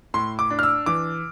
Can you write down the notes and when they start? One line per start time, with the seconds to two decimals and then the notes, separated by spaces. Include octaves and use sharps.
0.14 A2 C6
0.39 D6
0.50 D4
0.59 F6
0.63 E6
0.86 E3 D6